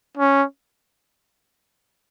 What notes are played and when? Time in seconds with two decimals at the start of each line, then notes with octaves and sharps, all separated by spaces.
0.17 C#4